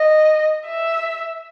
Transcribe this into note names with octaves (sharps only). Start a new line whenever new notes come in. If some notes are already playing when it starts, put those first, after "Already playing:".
Already playing: D#5
E5